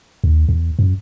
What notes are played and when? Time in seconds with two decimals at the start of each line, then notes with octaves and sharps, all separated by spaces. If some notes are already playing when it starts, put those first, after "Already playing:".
0.24 D#2
0.49 E2
0.79 F#2